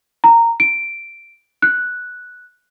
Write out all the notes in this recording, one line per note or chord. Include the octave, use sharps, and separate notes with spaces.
A#5
D7
F#6